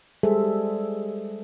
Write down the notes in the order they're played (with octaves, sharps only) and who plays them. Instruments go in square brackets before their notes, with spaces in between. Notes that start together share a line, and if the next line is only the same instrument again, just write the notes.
[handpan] G3 G#3 G#4 A4 C5 E5